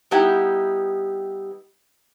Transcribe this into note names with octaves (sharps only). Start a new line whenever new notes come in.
G3 B3 D#4 E4 G4